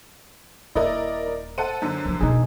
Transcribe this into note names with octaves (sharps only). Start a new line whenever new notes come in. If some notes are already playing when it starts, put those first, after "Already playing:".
D#1 E4 A#4 D5 D#5
A4 C5 F#5 D#7
F#2 D3
C#3 F3
B2 B3 D#4 G#4